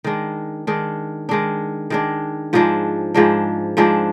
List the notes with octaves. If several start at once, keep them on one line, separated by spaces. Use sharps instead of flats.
D#3 G#3 D4
D#3 G#3 D4
D#3 G#3 D4
D#3 G#3 D4
G#2 F3 G#3 D4
G#2 F3 G#3 D4
G#2 F3 G#3 D4